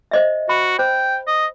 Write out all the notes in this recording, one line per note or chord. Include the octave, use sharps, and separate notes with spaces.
C5 D#5 E5
F#4 B5
C5 G5
D#5